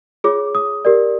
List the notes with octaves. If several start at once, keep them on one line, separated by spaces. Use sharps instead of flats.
F4 G#4 C#5 D6
D#6
G4 A#4 D5